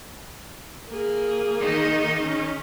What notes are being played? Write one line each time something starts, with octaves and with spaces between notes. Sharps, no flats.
A#3 G#4
D#3 D#4
C#4